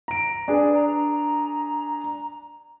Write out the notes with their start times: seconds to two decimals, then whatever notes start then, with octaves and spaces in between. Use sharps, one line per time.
0.08 A#5 D7
0.48 D4 G#4 B4 D5
0.75 A#5